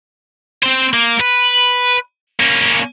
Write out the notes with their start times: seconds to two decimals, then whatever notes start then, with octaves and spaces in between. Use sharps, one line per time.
0.63 C4 C5
0.93 A#3
1.20 B4
2.40 A#3 C#4